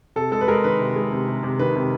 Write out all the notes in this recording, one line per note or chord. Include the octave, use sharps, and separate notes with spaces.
C3 A4
G#3 A4
B4
G#3 A#4
D#3 B4
C3
G#3
C3
C3
C3
D#3 B4
C3